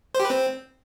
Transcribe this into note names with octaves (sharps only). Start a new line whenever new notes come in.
C5
G4
B4
C4